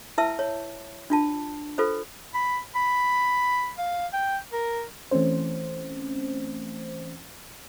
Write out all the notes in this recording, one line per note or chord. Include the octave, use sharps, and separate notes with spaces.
E4 B4 E5 A5 E6
C#5
D4 F4 A5
F4 A4 B4 C5
B5
B5
F5
G5
A#4
E3 A3 C4 C#4 C5